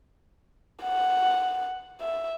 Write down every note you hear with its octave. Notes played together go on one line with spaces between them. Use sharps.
F#5
E5